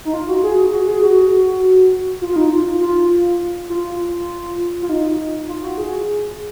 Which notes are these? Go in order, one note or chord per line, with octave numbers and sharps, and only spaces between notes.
D#4
F4
F#4
G#4
F#4
G#4
F#4
F4
F4
D#4
F4
F4
F4
F4
D#4
F4
F#4
G#4